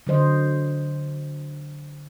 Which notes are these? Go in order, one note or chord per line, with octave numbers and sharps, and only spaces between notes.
D3 F#3 C5 D#5